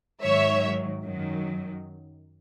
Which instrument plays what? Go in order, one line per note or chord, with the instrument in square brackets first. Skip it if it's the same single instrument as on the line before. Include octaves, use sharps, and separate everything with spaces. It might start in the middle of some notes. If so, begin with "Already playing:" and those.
[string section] G#2 D#3 F#3 C#5 E5
F#2 D#3 F#3